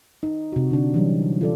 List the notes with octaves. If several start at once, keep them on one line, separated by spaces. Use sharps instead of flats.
D#4
C3 F#4
D3 D4
E3 F#3 G3 C4 C#4
F4 A4 D5